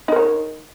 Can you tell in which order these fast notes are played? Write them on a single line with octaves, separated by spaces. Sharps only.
D#4 A#4 C#5